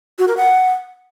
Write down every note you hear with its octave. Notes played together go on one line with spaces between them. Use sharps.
F#4
A#4
F#5